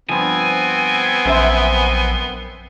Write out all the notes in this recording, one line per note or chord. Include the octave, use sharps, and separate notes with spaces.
G2 F3 B3 C4 G#5
A#1 F#2 C5 E5